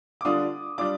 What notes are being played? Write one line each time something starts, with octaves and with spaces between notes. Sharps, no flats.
D6
D3 G3 D4 F4 D#6
G3 D4 F4 D6